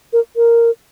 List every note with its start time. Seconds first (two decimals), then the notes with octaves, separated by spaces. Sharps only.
0.13 A#4
0.36 A#4